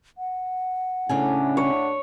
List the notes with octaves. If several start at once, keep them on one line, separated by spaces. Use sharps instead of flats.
F#5
A2 C#3 C#4 D4 G#5
C#5